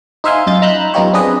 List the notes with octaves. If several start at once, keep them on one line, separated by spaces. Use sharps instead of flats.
D#4 C5 E5 F5 G#5 C6
F#2 F4 D#5 G6 A6
D#4 A#5 B5 E6 F#6 G6
F#2 B3 D#4 F4 G4 C#5
C4 D4 G#4 B4 D#5